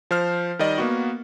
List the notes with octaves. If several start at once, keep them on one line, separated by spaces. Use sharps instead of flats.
F3 C5 F6
D#3 G3 D5 D#5
A#3 B3 F#4